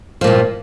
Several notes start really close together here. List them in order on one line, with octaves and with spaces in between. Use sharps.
F3 A#2 G2